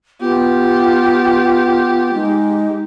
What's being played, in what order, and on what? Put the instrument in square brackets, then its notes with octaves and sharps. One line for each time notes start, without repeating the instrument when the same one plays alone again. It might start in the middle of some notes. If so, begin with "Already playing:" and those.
[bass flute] B3 [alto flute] F4 [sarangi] G4
[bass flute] G#3 [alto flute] D#4